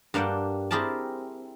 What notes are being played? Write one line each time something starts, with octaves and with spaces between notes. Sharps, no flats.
G2 A#3 D4 F#5 G5
C4 E4 G4 G#4 A#4 A5